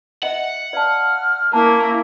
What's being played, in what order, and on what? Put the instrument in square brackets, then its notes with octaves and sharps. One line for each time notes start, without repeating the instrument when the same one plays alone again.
[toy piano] D#5 E5 [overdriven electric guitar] F#5
[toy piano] D5 F5 A5 [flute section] F6 F#6
[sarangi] A#3 [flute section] C#4 E4 A#4 [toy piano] A5